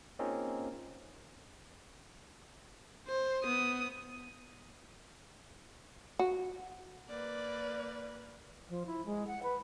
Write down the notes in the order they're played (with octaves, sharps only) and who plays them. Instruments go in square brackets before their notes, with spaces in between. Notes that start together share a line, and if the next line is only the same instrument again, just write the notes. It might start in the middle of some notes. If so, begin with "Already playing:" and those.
[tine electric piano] A#3 C4 C#4 D#4 F4 G#4
[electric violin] C5
B3 D#6
[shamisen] F#4
[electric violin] A#3 B4 [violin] D5
[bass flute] F3
E4
G#3
F#5
B4